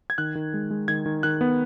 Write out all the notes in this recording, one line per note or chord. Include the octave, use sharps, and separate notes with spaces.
G#6
D#3 F#6
D#3
G#3
G#3
D#3 G#6
D#3
D#3 F#6
B3